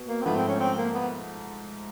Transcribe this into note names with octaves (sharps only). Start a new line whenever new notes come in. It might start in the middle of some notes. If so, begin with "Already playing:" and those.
Already playing: B2 B3
A#3
C4
G#2 F3 A3 B3
C4
C#4
C4
A#3
B3